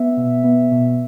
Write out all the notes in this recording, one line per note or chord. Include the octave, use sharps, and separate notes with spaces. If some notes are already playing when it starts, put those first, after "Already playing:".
Already playing: B3 E5
B2
B3
B2